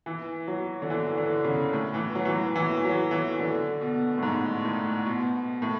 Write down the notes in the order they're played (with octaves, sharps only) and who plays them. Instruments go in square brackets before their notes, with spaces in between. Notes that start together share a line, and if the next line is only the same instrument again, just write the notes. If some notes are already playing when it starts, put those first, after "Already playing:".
[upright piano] E3
F#3
D3
E3
D3
C#3
A2
E3
F#3
E3
F#3
E3
F#3
E3
D3
B2
A2
G#2
A2
B2
A2